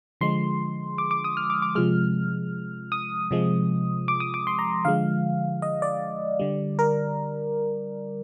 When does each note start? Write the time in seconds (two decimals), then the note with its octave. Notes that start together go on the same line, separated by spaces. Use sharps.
0.21 D3 F3 G#3 C6
0.98 D6
1.11 D6
1.24 D#6
1.37 F6
1.50 D6
1.62 D6
1.75 C3 F3 G#3 F6
2.92 D#6
3.31 C3 F3 G#3
4.08 D6
4.20 D#6
4.34 D6
4.47 C6
4.59 A#5
4.85 D3 F3 G#3 F5
5.62 D#5
5.82 D5
6.40 D3 G3
6.79 A#4